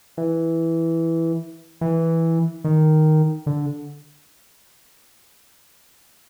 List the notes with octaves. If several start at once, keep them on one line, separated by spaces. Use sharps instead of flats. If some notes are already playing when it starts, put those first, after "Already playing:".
E3
E3
D#3
D3